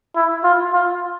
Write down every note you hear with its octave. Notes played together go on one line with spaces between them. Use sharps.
E4
F4
F4